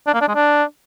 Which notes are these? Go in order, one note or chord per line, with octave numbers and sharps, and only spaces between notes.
D4
A#3
D4
G#3
D4